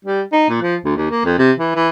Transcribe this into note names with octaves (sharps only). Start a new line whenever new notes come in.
G3
D#4
A#2
F3
D2
D#2
A#3
F2
C3
E3
E3